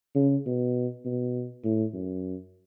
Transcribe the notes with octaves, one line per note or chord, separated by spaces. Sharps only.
C#3
B2
B2
A2
F#2